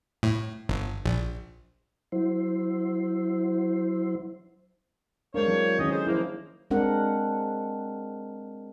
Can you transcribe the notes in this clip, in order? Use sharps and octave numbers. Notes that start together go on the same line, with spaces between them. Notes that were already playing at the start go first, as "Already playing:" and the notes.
A2
G1
A#1
F#3 E4 C5
G#3 A#3 D4 C5 C#5
E3 F#3 C4
D#3 C#4 D#4 G#4 B4 D#5
G#4 A4 C5
G#2 F3 A#3 E4
G#3 C4 D4 A#4 F#5